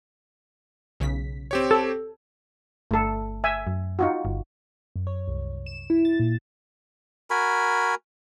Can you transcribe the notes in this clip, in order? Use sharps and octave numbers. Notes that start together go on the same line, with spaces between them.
B1 C#3 B6
C4 G4 C#5
A4
G1 A3 A4
E5 G#5
F#2
D#4 F4 F#4
G1
F#2
C#5
C2
E7
E4
A6
A#2
F#4 A#4 G#5 B5